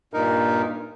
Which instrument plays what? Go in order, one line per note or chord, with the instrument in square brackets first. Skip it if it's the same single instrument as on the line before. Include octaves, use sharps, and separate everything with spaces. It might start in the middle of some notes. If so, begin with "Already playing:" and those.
[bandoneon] G2 A#2 D#4 A#4